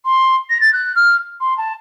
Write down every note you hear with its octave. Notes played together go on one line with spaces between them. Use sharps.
C6
A#6
A6
F#6
F6
C6
A5